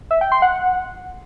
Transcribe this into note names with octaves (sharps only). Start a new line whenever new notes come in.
E5
G5
C6
F#5